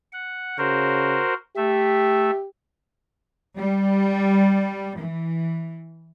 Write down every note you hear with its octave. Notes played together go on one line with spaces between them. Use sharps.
F#5
C#3 F#4 A#4 C5
A3 G4 E5
G3
E3